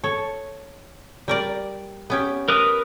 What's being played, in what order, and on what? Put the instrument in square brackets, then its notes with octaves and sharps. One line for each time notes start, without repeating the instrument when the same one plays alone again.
[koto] A4 C#5
G3 A#4 D5
B3 C#4 G4
[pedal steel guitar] A#4 B4 D#6